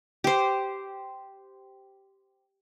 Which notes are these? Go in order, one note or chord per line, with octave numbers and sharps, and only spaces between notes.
G4 C5